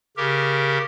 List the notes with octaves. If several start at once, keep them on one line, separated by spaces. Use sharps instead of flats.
C#3 G4 A#4